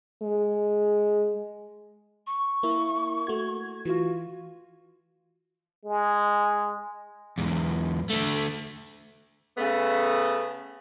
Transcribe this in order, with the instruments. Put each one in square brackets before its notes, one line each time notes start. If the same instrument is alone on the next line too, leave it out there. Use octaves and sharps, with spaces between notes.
[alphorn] G#3
[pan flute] C#6
[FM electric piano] A#3 E4
A3 F#4 G#6
[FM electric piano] E3 F4 [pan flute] F#4
[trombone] G#3
[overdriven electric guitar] E2 G#2
D3 A3
[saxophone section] C#3 A3 B3